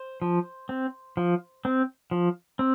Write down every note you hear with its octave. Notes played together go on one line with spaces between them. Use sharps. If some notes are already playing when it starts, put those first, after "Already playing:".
Already playing: C5
F3
C4
F3
C4
F3
C4